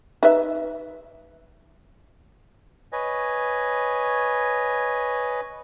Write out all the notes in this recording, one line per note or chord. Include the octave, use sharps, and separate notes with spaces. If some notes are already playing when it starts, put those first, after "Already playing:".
D#4 B4 E5
B4 C#5 D#5 G#5